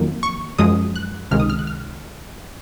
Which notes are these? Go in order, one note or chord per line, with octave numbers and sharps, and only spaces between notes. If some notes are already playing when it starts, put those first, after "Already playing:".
Already playing: F2 D#3 F#3 A#3
C#6
F#2 F3 G#3 D#6
F#6
C#2 C3 D#3 G#3 F6
D#6
F6
F#6
F6